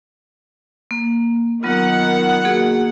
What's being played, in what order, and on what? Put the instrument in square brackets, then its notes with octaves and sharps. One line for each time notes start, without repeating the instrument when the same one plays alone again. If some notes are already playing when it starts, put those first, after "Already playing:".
[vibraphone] A#3
[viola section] D#3 F#5 [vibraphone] F#3 B3 F4
[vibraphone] A#3 F#4 G#4